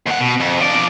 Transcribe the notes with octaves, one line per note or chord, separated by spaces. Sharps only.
D#2 F#5
B2
F2
F3 D5